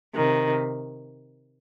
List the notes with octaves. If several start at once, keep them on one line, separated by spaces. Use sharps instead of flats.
C3 D#3